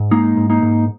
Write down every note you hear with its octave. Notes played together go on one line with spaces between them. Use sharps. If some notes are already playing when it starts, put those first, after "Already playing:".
Already playing: G#2
G#3 A#3 D#4
G#2
A#3 D#4
G#2